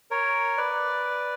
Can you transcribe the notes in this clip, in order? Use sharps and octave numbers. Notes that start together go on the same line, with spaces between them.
A#4 C#5
B4 D5